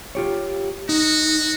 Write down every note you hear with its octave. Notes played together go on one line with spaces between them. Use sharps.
F4 G4 C#5
D#4 F#4